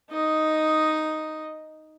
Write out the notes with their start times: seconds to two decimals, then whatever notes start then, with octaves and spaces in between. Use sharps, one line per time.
0.11 D#4 D#5